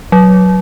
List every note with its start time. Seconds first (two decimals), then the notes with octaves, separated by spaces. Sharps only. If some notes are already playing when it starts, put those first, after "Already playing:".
0.12 F#3